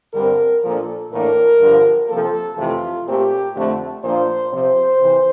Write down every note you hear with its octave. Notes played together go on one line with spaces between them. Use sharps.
G2 D3 G3 C4 A#4
A#2 F3 A#3 D4 A4
A2 E3 A#3 D4 A#4
G2 D3 F3
C3 F3 A#3 A4
F2 C3 E3 A3 F4
A#2 A3 C4 G4
F2 D3 A3 C4
A#2 F3 A#3 D4 C5
C3 F3 C4 C5
C3 E3